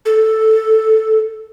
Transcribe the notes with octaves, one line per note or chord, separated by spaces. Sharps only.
A4